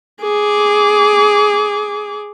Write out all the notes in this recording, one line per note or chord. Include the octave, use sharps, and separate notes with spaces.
G#4 D6